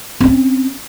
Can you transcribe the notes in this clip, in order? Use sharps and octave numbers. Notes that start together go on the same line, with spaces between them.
C4 C#4